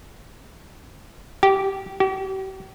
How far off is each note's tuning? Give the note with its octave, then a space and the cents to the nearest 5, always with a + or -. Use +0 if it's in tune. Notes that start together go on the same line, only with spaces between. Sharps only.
G4 -15
G4 -40